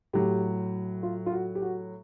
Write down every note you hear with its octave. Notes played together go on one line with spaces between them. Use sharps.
A2 F#3 G4
F4
F4
F#4
G4
F#4